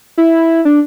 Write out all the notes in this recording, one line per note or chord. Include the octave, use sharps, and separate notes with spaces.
E4
D4